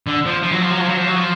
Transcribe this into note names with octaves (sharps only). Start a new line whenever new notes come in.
D3
F3
F3
F#3
F3
F#3
F3
F#3
F3
F#3
F3